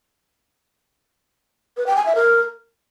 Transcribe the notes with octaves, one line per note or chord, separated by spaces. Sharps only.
B4
G5
G#5
E5
A#4